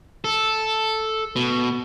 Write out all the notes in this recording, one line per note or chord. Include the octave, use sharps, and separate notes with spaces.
A4
B2